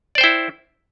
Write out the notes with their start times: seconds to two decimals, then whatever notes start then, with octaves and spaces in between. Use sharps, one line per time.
0.15 D5
0.18 C5
0.21 G5
0.24 E4